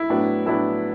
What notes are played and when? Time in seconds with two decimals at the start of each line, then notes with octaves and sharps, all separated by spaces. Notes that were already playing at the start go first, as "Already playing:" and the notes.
Already playing: E4
0.10 A2 F#3 B3 D4
0.46 A2 F#3 B3 D4 E4